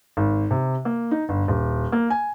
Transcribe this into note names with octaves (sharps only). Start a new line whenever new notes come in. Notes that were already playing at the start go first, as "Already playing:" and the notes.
G#1
C3
A#3
D#4
G1
D#1
A#3
G#5